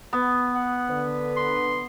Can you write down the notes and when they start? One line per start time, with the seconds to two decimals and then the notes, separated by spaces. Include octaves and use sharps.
0.13 B3
0.55 F#5
0.90 D3 B4
1.37 C6